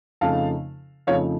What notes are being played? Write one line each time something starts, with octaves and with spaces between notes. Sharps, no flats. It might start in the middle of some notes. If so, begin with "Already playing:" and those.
F2 C#3 F3 A3 D#4 F5 A5
F2 C#3 F3 A3 D#4 C#5 F5